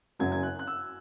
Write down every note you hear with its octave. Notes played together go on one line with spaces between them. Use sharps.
F#1 F#2 C#3 F#3 G#6
G#6
F#6
F#6
E6